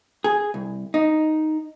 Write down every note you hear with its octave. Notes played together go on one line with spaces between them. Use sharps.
G#4
C2
D#4